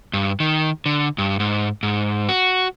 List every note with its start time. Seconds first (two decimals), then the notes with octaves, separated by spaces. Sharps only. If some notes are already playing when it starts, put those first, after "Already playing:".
0.13 G2
0.40 D#3
0.86 D3
1.18 G2
1.40 G#2
1.83 G#2
2.29 F#4